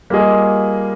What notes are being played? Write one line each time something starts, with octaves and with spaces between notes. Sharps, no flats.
G3 A#3 F4 G#4 D#5